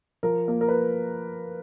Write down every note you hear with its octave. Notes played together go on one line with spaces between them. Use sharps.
F3 A#4
A#3
A#4
B4